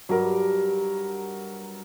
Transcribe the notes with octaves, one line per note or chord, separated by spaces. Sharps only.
G2 F#3 A#4